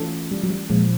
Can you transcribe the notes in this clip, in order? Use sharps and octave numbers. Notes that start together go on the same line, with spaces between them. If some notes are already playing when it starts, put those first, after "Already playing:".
Already playing: E3 A3 C#4 F4 A4
G3
F#3
G3
A#2 F3 G#3 A#3